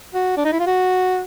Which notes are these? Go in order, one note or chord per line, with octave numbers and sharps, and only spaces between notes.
F#4
D4
D#4
E4
F4
F#4